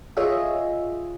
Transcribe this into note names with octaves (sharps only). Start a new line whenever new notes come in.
F4 G#4 C#5 D#5 E5